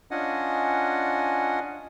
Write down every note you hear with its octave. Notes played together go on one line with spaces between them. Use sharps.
C#4 D4 F4 D#5 F#5 G#5